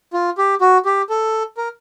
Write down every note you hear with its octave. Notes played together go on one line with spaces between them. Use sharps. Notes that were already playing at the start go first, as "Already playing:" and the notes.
F4
G4
F#4
G4
A4
A#4